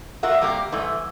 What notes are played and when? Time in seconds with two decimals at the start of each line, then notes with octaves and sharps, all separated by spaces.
0.23 F4 F#4 A#4 E5 F#5
0.41 C3 G3 A#3 G4 A#4
0.72 G#2 E3 G3 A3